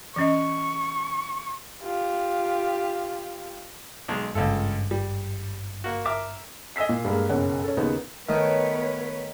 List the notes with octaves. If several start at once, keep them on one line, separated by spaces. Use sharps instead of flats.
E3 C#4 D#5 C#6
F4 G4
B1 G#3
G#1 C#2 G2 F4 A4
G3
A#3 F#4
A#4 E5 D6
D#5 G#5 E6 B6 C7
A#2
G2 G#3 A#3
F#1 B1 C#4 F#5
C#4 A4
D#2 C#3 B3 D#4
D#3 A3 B3 B4 C#5 D#5 G6